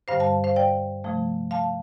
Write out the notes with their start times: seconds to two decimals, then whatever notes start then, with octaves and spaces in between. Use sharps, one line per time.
0.08 G2 D3 G3 C5 F5
0.20 F5 A5
0.44 C5 F5
0.56 D5 G5
1.04 C3 F3 A3
1.51 F5 A5